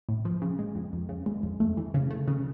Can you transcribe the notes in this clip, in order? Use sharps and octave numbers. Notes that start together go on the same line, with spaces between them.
A2
F3
C#3
G#3
F2
F2
C#3
G#3
F2
A3
E3
C#3
A3
C#3